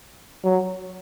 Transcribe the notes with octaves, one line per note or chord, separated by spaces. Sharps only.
F#3